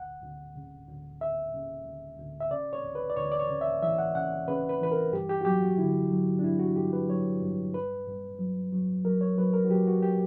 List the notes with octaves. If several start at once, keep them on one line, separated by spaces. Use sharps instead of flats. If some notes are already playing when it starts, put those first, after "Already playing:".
Already playing: D2 F#5
D2
C#3
D2
D2 E5
C#3
D2
D2
E5
C#3 D5
C#5
D2
B4
D5
D2 C#5
D5
C#5
C#3
E5
E3 E5
F#5
C#3 F#5
C#3 B4
B4
E3 B4
A#4
G2 G4
G4
F#4
F#3 G4
F#4
D3 E4
F#3
D4
G2 E4
F#4
G2 G4
B4
F#3 C#5
G2
G2 B4
G2
F#3
F#3
F#3 A#4
C#5
F#3 B4
A#4
F#4
F#3 G4
F#4
G4